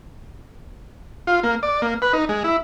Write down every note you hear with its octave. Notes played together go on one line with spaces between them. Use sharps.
F4
A#3
D5
A#3
B4
D#4
G#3
E4